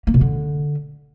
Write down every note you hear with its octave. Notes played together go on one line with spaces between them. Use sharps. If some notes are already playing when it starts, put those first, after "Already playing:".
A#3
B2
D3